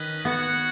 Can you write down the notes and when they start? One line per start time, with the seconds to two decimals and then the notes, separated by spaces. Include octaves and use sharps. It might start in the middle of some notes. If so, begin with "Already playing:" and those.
Already playing: D#3 C#4 B4 D#5
0.25 B3 F#4 C#5 F#5